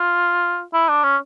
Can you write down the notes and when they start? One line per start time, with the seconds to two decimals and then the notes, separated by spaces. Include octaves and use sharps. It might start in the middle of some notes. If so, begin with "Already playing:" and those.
Already playing: F4
0.74 E4
0.89 D4
1.03 C#4